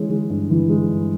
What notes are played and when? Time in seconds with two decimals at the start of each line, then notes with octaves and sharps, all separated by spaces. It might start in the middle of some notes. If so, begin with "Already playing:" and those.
Already playing: E3 G#3 C#4
0.10 G#3
0.30 G2
0.50 E3
0.69 G#3
0.89 G2